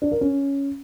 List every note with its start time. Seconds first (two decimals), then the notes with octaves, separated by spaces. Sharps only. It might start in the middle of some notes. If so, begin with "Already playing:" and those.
0.02 D4
0.11 A#4
0.21 C#4